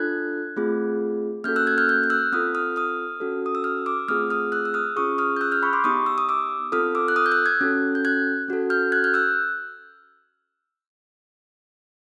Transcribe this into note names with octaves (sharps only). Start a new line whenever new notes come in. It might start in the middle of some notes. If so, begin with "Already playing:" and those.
Already playing: D4 F4 A4 F#6 G#6
A3 C4 F4 G#4
A#3 C#4 F#4 A4 F6 G6
E6 F#6
F#6 G#6
F6 G6
F6 G6
F6
E6 F#6
C4 F4 A4 D#6 F6
D#6 F6
D#6 F6
C#4 F#4 A4
D#6
E6
D#6 F6
D6 E6
A3 C4 F4 G#4 D#6 F6
D#6 F6
E6 F#6
E6
D#6 F6
C#4 F4 G#4 C#6 D#6
D#6 F6
G6
E6 F#6
F6 G6
B5 C#6
C6 D6
B3 D#4 G4 C#6 D#6
E6
D#6
D6 E6
C4 F4 A4 D#6 F6
D6 E6
F#6
D#6 F6
G6
E6 F#6
F#6 G#6
C#4 F#4 A4
G6
F#6 G#6
C#4 F#4 A4
F6 G6
F#6 G#6
F6 G6
E6 F#6